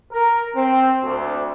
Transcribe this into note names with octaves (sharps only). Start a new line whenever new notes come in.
A#4
C4
D2